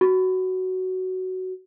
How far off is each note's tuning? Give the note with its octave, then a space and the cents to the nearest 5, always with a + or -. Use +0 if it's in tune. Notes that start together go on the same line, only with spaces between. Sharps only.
F#4 +10